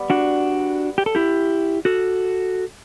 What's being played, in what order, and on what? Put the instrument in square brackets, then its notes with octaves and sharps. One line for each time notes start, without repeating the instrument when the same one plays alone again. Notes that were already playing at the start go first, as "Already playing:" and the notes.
Already playing: [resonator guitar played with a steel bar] G3 B3
[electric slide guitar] D4 F#4
G4
A4
E4 G4
F#4 A4